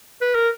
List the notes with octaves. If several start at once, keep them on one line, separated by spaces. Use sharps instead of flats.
B4
A#4